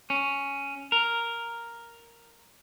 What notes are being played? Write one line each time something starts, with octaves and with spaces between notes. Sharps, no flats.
C#4
A#4